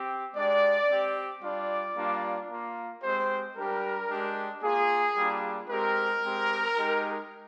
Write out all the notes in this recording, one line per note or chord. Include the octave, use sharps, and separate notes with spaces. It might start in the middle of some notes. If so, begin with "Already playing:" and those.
Already playing: C4 G4
G#3 D4 G4 D5
C4 G4
G3 D4 F4 D5
G3 A#3 D4 F4
A#3 F4
G#3 C4 G4 C5
G3 D4 G4 A#4
G#3 D4 G4
A#3 F4 G#4
G3 A#3 D4 F4
G#3 C4 G4 A#4
G#3 C4 G4
G#3 D#4 G4